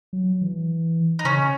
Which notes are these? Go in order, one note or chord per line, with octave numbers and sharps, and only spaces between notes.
F#3
E3
D#4
C#3 C#4